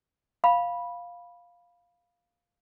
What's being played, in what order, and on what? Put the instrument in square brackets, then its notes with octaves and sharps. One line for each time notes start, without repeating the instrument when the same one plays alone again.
[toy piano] F5 B5